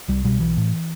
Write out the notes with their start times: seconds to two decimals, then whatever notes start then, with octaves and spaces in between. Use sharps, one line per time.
0.08 C2 G3
0.24 B2 G3
0.40 B1 E3
0.57 A2